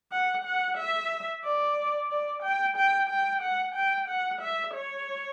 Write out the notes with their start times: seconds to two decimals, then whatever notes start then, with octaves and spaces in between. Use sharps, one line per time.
0.12 F#5
0.45 F#5
0.78 E5
1.45 D5
2.11 D5
2.43 G5
2.77 G5
3.10 G5
3.42 F#5
3.75 G5
4.09 F#5
4.42 E5
4.75 C#5